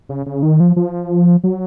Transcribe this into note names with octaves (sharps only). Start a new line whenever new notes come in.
C#3
C#3
D#3
F3
F3
F#3